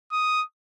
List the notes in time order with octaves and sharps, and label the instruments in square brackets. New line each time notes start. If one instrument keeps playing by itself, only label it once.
[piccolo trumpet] D#6